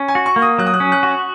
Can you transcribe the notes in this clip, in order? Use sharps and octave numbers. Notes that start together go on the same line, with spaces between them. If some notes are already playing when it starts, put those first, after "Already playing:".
Already playing: C#4
G#5
F#4
C#6
A#3
D#6
F#3 F#6
D#6
F#6
C#4
F#6
F#4